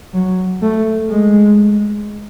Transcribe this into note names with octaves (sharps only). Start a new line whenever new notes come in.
F#3
A3
G#3